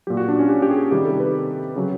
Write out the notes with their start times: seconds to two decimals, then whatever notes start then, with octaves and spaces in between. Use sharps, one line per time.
0.07 A#2 F#3 G4
0.17 F#4
0.28 D4
0.39 C#4
0.49 G4
0.62 G4
0.71 G#4
0.91 C3 D#3 G3 G4
1.05 A4
1.20 B4
1.76 C#3 F#3